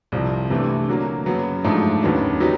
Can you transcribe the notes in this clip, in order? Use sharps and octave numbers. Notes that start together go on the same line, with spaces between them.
C2 C3 F3
C3 E3 A3 D4
D3 F#3 A#3
F#2 C#3 F#3 B3
G#2 F3 A3 D4
D#2 C#3 F#3 B3 D4
F#3 B3 D#4 G4